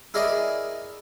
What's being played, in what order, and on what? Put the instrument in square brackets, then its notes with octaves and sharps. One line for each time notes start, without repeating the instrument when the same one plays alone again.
[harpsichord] E4 G#4 A#4 D5 D#5